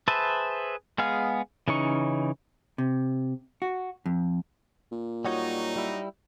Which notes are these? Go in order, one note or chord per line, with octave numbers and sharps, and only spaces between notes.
G#4 B4 C5 E5 A5
G#3 B3 G#4 F5
C#3 E3 C#4 D#4 C#6
C3
F#4
F2
A#2
F#3 G3 D#4 F#4 C#5
G3 E4